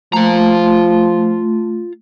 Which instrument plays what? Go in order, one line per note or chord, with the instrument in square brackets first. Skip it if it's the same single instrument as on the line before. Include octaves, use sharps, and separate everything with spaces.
[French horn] F3 [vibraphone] A3 [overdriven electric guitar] F4 A#5